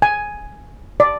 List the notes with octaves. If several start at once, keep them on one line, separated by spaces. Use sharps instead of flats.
G#5
D5